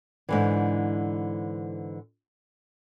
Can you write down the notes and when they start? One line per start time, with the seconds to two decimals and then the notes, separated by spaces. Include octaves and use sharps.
0.29 G#2 D3 E3